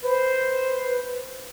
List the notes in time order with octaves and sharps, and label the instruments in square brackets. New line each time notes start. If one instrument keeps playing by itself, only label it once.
[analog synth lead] B4 [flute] C5